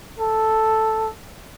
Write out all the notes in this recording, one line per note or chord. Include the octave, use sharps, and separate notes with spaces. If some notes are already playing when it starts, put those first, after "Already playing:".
A4